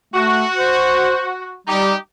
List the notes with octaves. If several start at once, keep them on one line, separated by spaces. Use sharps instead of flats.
A3 F#4
C5
G3 D#4 G4